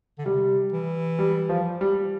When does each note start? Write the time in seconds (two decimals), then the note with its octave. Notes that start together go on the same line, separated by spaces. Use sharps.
0.19 D3
0.26 C3 G3
0.73 E3
1.19 G3
1.49 F3
1.81 G3